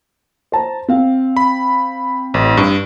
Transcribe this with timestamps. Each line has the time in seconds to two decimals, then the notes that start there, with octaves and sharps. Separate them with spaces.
0.52 C5 A5 A#5
0.88 C4 F5
1.37 B5
2.34 A1
2.57 G2